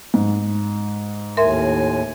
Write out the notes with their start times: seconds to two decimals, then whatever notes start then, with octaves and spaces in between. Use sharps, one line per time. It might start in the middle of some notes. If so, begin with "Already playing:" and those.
0.14 G#2
1.37 D#2 A2 A#4 E5 G#5 C6